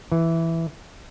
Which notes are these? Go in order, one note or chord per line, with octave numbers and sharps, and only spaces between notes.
E3